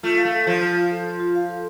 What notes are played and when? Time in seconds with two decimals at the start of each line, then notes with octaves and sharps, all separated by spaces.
0.03 A3 F4
0.17 F5
0.25 A3
0.32 A4
0.47 F3 F4
0.61 F4
0.76 F5
0.91 A4
1.05 F4
1.20 F4
1.35 F5
1.49 A4